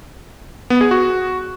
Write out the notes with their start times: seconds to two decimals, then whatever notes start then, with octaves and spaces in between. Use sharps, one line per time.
0.70 B3
0.81 G#4
0.91 F#4